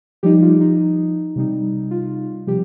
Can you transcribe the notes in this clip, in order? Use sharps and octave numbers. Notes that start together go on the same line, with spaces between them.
F3 G3 D#4 G4
F4
D#4
C3 G3 D#4
F4
C3 F3 G3 G4